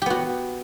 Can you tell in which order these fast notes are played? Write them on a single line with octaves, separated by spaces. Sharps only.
G4 B3 F#4